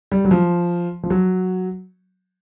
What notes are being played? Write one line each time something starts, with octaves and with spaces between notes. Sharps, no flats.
G3
F#3
F3
F3
F#3